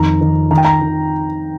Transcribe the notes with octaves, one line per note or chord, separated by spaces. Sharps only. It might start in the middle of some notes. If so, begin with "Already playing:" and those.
Already playing: F2 D#3 A#5
D#3
D#3 A#5
G5
A#5
D#3